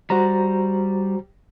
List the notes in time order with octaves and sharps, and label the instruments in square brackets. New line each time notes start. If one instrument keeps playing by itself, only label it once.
[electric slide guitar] G3 [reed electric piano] F#4 C5 A#5